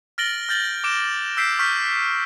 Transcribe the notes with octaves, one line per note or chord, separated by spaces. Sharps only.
F6 A6 A#6 D7 F#7 G7
F6 G6 A6 F#7
D6 F#6 D7 E7
E6 G6 B6 C7 D7 E7
C#6 F6 G6 B6